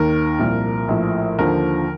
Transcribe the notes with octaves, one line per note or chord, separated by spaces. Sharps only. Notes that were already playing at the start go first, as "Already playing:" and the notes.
Already playing: D#2 D#3 A#4
C2 A#2 F3
A#1 A2 F3
D#2 D3 F3 A#4